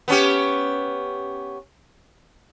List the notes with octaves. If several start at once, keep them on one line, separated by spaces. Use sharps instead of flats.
B3 C#4 G4